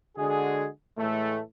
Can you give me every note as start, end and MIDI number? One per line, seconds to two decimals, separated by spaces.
0.17 0.67 50
0.17 0.67 56
0.17 0.67 66
0.17 0.67 68
0.98 1.40 45
0.98 1.40 52
0.98 1.40 56
0.98 1.40 57